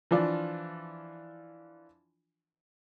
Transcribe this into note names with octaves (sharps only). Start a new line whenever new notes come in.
E3 F3 D4 F4